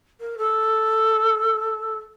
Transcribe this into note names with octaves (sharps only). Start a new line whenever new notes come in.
A#4
A4